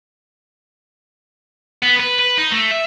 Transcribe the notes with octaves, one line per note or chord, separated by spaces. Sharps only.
B3
B4
B4
D#4
A3
E5